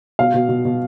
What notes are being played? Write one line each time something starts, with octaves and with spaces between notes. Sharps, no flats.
B2 F5
B2
B2
B2